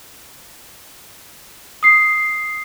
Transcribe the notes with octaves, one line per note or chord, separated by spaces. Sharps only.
D#6 C7